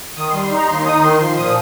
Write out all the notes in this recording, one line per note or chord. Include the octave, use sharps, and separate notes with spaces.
D#3 D#6
G3 C6
C6
D#4 A#5
D#2 C6
D#4 D#6
D#3 C6
F3 C6
A#2 D#6